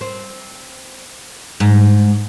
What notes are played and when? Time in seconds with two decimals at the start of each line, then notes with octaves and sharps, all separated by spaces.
0.01 C4
1.60 G#2